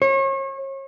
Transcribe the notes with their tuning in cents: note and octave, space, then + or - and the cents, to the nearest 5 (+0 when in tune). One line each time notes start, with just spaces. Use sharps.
C#5 -35